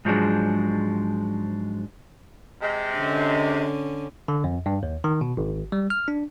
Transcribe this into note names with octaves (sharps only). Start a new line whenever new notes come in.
G#2 F3 F#3 G#3 D4
C3 G#3
D3 C#4
D3
F2
G2
D#2
D#3
B2
G#1
G3
F6
D4